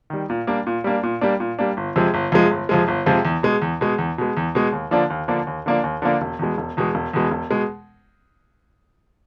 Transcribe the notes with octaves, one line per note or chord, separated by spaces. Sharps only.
D#3 G3
A#2
G3 A#3 D4
A#2
G3 A#3 D4
A#2
G3 A#3 D4
A#2
G3 A#3 D4
G1
F2 C3 F3 G#3
G1
F2 C3 F3 G#3
G1
F2 C3 F3 G#3
G1
F2 C3 F3 G#3
E2
B2 G#3
E2
B2 G#3
E2
B2 G#3
E2
B2 G#3
D#2
D3 F3 A#3 D4
D#2
D3 F3 A#3 D4
D#2
D3 F3 A#3 D4
D#2
D3 F3 A#3 D4
E1
E2 B2 G#3
E1
E2 B2 G#3
E1
E2 B2 G#3
E1
B2 G#3